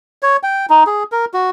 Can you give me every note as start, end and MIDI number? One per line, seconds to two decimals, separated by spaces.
0.23 0.37 73
0.43 0.66 79
0.70 0.84 63
0.87 1.03 68
1.12 1.25 70
1.34 1.50 66